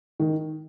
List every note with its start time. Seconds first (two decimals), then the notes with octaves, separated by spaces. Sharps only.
0.20 D#3